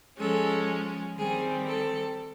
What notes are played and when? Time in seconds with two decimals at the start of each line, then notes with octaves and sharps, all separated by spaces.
0.19 F3 G#3 C#4 A4
1.18 D#3 G3 C4 G#4
1.68 A4